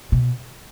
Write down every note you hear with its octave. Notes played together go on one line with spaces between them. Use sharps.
B2